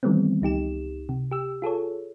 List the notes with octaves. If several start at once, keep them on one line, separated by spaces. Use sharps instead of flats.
D#3 E3 G3 A3 B3 C4
C#2 D#4 G4 E7
C3
G4 E6
F4 G#4 A4 C#5